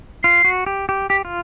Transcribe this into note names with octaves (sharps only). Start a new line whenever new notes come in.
F4 C7
F#4
G4
G4
G4 B6
F4